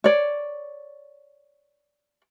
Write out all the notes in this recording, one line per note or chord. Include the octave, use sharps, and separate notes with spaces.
C#5 D5